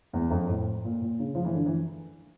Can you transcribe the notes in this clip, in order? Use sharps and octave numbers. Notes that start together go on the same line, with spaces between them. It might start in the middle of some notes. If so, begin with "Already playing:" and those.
E2
F2
A2
A#2
A#2
C#3
F3
E3
D3
E3